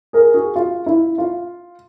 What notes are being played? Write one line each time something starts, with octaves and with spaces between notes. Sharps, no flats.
G#4 A#4
F#4 G#4
F4
E4
F4